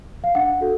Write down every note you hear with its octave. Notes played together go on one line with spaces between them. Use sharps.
F5
D4 F#5
F#4 A4